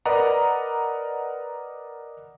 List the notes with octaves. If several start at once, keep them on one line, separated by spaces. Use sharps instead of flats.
A#4 B4 D5 D#5 F#5 A#5